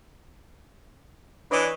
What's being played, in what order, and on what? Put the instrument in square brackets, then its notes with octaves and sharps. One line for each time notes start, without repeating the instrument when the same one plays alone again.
[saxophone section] E3 D4 [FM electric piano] B4 C#5 D#5